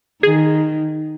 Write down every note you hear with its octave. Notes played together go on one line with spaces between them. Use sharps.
D#3 G#4